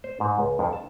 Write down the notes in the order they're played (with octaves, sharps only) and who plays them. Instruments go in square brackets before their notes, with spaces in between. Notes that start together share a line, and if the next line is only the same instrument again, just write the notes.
[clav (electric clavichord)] C5
G#2
C#2
F2
A5